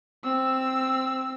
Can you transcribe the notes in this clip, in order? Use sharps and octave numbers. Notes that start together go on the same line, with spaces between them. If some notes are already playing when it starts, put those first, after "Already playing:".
C4 E6